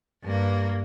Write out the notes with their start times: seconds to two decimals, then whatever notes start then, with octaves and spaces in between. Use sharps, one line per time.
0.24 G2 A#3